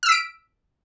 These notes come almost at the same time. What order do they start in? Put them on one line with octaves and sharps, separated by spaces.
F6 E6 B6 D7